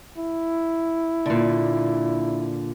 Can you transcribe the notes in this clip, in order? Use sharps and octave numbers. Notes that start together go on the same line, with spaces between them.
E4
A#2 D3